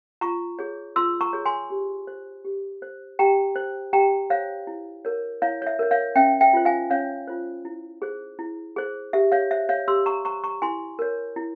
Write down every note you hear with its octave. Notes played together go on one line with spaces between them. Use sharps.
F4 A#5 C#6
G#4 C#5
F4 C6 E6
A#5 C#6
G#4 C#5
G#5 C6
G4
C5
G4
C5
G4 G5 A#5
C5
G4 G5 A#5
C5 C#5 F5
E4
A#4 C#5
E4 C#5 F5
C#5
E5
A#4 C#5
C#5 F5
C#4 E5 G5
E5 G5
F4 C5
F5 G#5
C#4 C#5 F5
F4 C5
E4
G#4 C5
E4
G#4 C5
G4 E5
C#5 F5
C5 E5
C#5 F5
G4 C6 E6
A#5 C#6
C5 A#5 C#6
A#5 C#6
E4 G#5 C6
A#4 C#5
E4